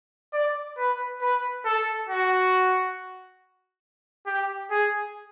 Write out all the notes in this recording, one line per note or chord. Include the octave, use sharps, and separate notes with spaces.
D5
B4
B4
A4
F#4
G4
G#4